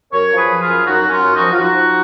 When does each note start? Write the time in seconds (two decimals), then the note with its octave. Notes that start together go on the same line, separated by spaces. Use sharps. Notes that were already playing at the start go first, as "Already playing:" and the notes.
0.12 F#2 A#4 C#5
0.31 F3
0.37 G#4 B4
0.49 F3
0.61 F4 G#4
0.68 F#2
0.85 F#2 D#4 F#4
1.04 F#2
1.10 C#4 F4
1.22 F#2
1.34 D#4 F#4
1.40 F3
1.52 F4
1.58 F3 D#4 F#4
1.76 F3